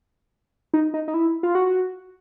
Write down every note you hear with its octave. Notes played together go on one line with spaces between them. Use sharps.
D#4
D#4
D#4
E4
F4
F#4